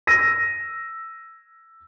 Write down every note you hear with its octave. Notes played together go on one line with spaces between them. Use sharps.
E6 A#6 D#7